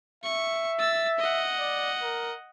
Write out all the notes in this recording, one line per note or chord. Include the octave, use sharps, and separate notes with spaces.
E5 C#6
E6 A6
D#5 F#5
D5
A#4